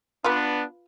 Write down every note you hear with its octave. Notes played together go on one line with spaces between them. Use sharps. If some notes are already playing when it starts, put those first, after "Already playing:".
B3 D4 F4 B4